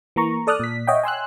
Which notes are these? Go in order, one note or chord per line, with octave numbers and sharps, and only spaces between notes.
E3 A#3 A#5 C#6
A4 D5 D#6 F6 F#6
A#2 B6
C#5 D#5 E5 F#5 G5
G#5 C6 E6 F#6